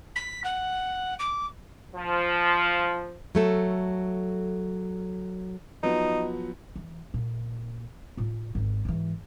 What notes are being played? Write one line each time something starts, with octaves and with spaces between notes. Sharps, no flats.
B6
F#5
D6
F3
F#3 A3 A4
F3 F#3 B3 D#4
E3
A#2
A2 F4
G#1 D#3
G#2 E3